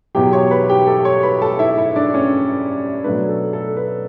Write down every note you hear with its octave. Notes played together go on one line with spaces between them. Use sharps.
E2 B2 F#3 G4 G5
C#5 C#6
B4 B5
G4 G5
A4 A5
C#5 C#6
B4 B5
A4 A5
E4 E5
E4 E5
D4 D5
C#4 C#5
B2 F#3 A3 D4 B4
A4
A4
B4